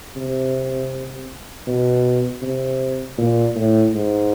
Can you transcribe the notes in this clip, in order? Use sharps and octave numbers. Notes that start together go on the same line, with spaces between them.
C3
B2
C3
A#2
A2
G#2